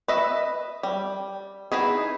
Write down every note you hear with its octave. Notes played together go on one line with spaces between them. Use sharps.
B4 D#5 E5
G3
B3 D#4 E4 G#4